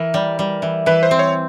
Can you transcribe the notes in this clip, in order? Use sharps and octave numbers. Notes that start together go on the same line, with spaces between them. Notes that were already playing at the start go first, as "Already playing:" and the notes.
Already playing: E3 A#4
G3
G3
E3
E3 B4
C5
C4
C#5